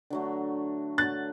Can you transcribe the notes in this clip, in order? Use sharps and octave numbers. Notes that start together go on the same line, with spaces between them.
D3 F#3 A3
D3 F#3 A3 F#6 A6